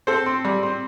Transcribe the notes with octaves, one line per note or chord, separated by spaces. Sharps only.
C4 A4 C5
C4
G3
C4